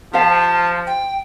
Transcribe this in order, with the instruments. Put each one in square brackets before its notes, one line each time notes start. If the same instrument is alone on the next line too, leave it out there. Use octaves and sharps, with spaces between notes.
[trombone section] F3 [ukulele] G4 C5 F5 [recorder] A5
[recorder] G5